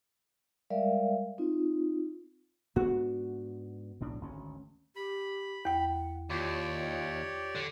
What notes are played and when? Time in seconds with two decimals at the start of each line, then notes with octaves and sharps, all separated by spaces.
0.70 G3 G#3 A#4 D5 E5 F5
1.38 C4 D#4 F4
2.76 G#2 B3 D4 F#4
4.00 B1 A2 D4
4.21 G#1 D2 C#4
4.96 G4 B5
5.65 E2 F#5 G5
6.30 D#2 F4 G4 C#5 D5
7.55 D3